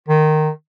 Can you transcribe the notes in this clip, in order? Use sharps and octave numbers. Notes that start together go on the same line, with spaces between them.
D#3